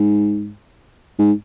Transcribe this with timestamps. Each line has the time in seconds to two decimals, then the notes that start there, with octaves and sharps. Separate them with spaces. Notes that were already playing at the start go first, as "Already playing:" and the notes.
Already playing: G#2
1.19 G#2